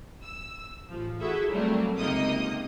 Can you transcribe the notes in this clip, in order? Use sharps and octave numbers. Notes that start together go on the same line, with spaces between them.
E6
A1 F3
E4 F#4 G#4 A4 E5
F#3 G3 A3 A#3 C4
C#2 C3 A#3 D#4 D#5 D#6